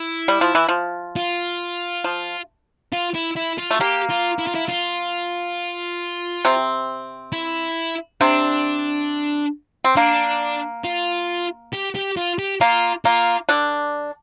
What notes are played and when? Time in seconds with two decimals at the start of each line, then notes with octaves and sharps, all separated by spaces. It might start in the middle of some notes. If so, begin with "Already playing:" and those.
Already playing: E4
0.28 G3
0.41 F3
0.55 E3
0.69 F3
1.16 F4
2.04 F3
2.92 F4
3.14 E4
3.36 E4
3.58 F4
3.71 A3
3.80 A#3 G4
4.10 F4
4.39 E4
4.47 F4
4.55 E4
4.68 F4
6.45 C3 C4
7.32 E4
8.21 C3 C4 D4
9.84 C4
9.96 A#3 D4
10.84 F4
11.73 G4
11.95 G4
12.17 F4
12.39 G4
12.61 A#3 F4
13.05 A#3 F4
13.49 D3 D4